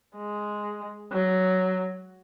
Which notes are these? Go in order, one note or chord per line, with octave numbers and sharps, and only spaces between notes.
G#3
F#3